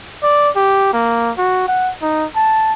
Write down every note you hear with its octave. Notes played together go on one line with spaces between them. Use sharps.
D5
G4
A#3
F#4
F#5
D#4
A5